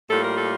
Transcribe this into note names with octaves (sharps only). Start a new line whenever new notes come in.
A2 G3 A#3 F4 A4
A#4
A4